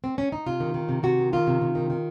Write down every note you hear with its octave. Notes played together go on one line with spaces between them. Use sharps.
C4
C#4
D#4
C3 F4
D#3
D#3
C3
C3 F#4
D#3
D#3 F4
C3
C3
D#3
D#3